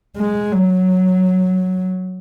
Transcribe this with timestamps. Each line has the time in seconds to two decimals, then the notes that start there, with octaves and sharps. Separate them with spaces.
0.17 G#3
0.53 F#3